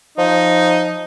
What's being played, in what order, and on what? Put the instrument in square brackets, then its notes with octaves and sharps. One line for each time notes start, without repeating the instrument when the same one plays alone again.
[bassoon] F3 [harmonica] D#4